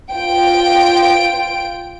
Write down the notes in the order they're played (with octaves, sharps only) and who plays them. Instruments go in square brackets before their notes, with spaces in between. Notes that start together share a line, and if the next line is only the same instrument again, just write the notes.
[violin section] F4 G5 D7